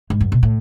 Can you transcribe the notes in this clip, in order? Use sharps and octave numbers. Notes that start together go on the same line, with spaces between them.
G#2
F#2
B2
A2